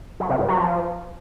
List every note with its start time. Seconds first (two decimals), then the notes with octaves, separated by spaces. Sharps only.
0.20 F#3
0.29 C3
0.39 G2
0.49 F#3
0.58 F3